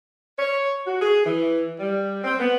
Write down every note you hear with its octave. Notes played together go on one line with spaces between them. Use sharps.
C#5
F#4
G#4
E3
G3
C4
B3